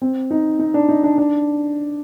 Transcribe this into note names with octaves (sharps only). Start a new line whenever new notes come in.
C4
D#4
D#4
D4
D#4
D4
D4